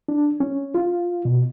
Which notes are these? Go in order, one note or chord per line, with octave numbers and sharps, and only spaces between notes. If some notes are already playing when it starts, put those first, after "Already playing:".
D4
C#4
F4
B2